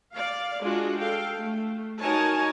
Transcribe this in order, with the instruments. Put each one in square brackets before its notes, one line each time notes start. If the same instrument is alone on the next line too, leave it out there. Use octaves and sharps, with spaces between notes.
[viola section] D5 F5
G#3 D4 F4 F#4 G#4
A4 F5 G5
A3
D#4 F#4 A#4 C#5 G#5 A5